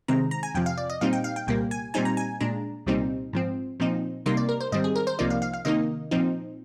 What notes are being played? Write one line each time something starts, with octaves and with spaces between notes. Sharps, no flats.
C3 D#3 G#3 C4 A#5
A#5
G#5
F2 C3 F3 G5
F5
D5
D#5
A#2 G3 C4 D#4 F5
G5
F5
G5
C2 A#2 G3 A#3 G5
G#5
A#2 G3 C4 D#4 G#5
A#5
G#5
A#2 G#3 D4 A#5
C2 A#2 G3 C4 D#4
G#2 F3 C4
A#2 F3 C4 D#4
C3 G3 A#3 D#4 C6
D5
A#4
C5
G#2 D#3 G3 C4 D#5
G#4
A#4
C5
C2 C3 F3 A#3 D#4 D5
F5
F5
F5
C3 D#3 A#3 D#4 D#5
A#2 F3 C4 D#4